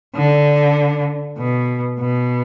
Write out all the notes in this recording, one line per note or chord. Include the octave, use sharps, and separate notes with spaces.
D3
B2
B2